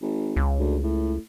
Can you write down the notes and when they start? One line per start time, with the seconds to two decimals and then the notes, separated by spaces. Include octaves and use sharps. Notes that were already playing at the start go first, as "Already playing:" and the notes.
0.02 G#1
0.36 C#2
0.59 D2
0.83 A2